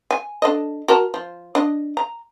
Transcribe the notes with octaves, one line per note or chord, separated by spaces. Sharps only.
G#5
D4 A4 D#5
F#4 A#4 A5
F3
D4 D#5
A#5